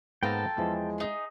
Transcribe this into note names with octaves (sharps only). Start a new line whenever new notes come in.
G#2 A#3 B3 F4 A4 G5 A5 A#5
E2 E3 F3 G#3
D#4 G#4